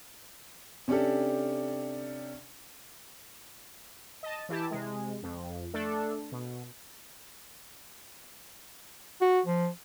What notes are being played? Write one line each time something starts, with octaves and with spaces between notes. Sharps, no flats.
C3 C#4 D4 G4 A4
D#5 A5
E3 E4 G4 A5
C3 G#3
F2
A3 D4 A4
B2
F#4
F3